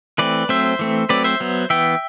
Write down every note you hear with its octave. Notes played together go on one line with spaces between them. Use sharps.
E3 A3 C4 B4 D5
F#3 A3 C4 C5 E5
E3 A3 C4
F#3 A3 C4 B4 D5
C5 E5
F#3 B3
E3 B3 E5 G5